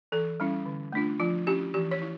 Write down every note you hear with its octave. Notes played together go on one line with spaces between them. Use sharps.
E3 A4
G3 C#4 E4
D3
A3 D4 F4
F3 F4
C#4 E4 G4
E3 G4
C#5
E4